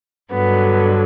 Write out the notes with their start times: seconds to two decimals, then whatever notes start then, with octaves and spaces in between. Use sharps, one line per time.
0.32 G2 D3 F#3 B3